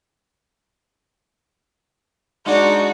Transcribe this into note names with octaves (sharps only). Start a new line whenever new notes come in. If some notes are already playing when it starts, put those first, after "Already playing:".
G#3 D4 D#4 F#4